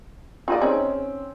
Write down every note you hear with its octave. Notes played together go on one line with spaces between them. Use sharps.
D#4 F4 F#4 D5 D#5
C4 C#4 D#4 G#4